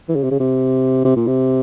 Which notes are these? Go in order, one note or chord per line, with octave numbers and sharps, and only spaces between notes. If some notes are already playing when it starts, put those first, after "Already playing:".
E3
C#3
C3
C#3
C3
C3
A#2
C3